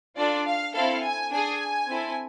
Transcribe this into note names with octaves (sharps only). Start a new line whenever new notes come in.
D4 F4 A4 D5
F5
C4 E4 A4 F5
G#5
D4 G#4 G#5
C4 E4 A4